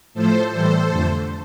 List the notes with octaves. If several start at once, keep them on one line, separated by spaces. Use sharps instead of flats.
A2 F3 A3 A4 C5
A2 E3 G3 A4 C5
F2 D3 A3